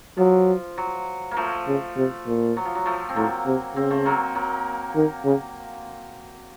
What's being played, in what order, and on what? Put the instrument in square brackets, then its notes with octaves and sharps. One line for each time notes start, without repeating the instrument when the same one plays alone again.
[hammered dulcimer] F3 [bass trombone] F#3
[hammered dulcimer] F#3
A#3
F3 A3
[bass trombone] C#3
C3
A#2
[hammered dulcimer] F#3
F3
F#3
F3 A3
C4
[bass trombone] A2 [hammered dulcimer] F#3 A#3
[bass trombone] C3
[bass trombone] C#3 [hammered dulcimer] C4
[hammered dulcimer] A3 C4
F#3 A#3
F#3 A#3
[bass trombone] D#3
C#3